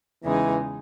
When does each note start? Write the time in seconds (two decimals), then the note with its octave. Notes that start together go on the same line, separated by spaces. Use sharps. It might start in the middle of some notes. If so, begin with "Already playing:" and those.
0.24 E2 C#3 E3 G#3 D#4 G#4